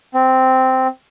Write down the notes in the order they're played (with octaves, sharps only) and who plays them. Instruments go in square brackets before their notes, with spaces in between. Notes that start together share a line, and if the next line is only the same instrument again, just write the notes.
[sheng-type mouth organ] C4